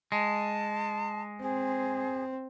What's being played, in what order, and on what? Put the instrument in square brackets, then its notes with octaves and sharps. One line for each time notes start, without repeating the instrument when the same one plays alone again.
[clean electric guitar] G#3 [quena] A5
[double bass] C4 [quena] G#4